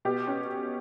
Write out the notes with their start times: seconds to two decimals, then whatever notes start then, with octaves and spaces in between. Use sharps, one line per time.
0.05 B2 G4
0.27 C#4